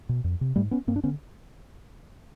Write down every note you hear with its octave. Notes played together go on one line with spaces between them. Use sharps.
B2
F2
C3
G#2 G3 A3
B3 C#4
G2 A#3 C4
D4
D3 B3 C#4